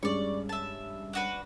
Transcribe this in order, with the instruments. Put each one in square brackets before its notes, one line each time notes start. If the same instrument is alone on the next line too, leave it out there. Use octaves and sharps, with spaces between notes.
[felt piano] G2 G#3 C#4 [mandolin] D5 C#6
[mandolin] E5 A5
D4 F#4 B4